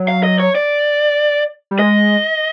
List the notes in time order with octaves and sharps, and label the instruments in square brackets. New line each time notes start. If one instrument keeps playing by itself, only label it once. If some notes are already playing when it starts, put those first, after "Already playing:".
Already playing: [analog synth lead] F#3
[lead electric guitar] F5
D#5
C#5
D5
[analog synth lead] G3
[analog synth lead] G#3 [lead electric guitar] D#5